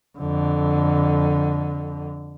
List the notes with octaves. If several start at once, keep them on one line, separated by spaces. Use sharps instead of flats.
F2 D3